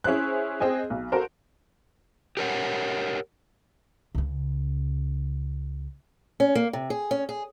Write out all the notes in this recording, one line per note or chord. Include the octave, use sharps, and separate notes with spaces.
C#4 E4 G#4 C5 F#6
C4 G#4 D#5 G#5
B1
F#4 A4 A#4 C5
G4 A#4 C#5 F#5
C#2 C#3
C#4
A#3
C3
G#4
C#4
G#4